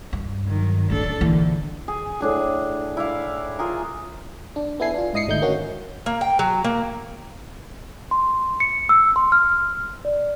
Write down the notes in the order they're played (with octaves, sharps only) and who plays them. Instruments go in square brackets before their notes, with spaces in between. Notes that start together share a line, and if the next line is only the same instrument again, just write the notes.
[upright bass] G2
[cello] D#3 F#3
[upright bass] D1 F#2 [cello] D4 A4
[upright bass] A#1 E3 [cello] D3
[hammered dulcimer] G#4
A2 D4 G#4
E4 D5 F5
F4 G#4 A#4
[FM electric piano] D4
B3 D4 E4 A4 G#5 C7
D4 F4
G#2 E4 D#5 D#6 C7 C#7
G#1 D3 A3 D#4 E4 G6
A#3 C#4 F#4
[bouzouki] A#3
G5
F#3
A#3
[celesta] C6
C#7
E6
C6
F6
D5